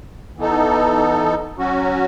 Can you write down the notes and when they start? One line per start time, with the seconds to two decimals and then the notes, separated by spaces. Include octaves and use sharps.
0.37 E3 B3 D#4 A4
1.58 F#3 C#4 F#4